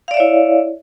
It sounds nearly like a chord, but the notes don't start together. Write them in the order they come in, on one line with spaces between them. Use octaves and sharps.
F5 D5 E5 C#5 E4